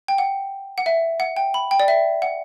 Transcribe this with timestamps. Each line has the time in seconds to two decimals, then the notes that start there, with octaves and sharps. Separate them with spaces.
0.08 G5
0.18 F#5
0.78 F#5
0.86 E5
1.20 F#5
1.37 G5
1.54 B5
1.71 G5
1.80 D5
1.88 E5
2.22 F#5